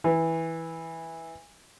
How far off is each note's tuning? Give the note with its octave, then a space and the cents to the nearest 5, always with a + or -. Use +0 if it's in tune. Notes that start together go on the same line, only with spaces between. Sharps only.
E3 -10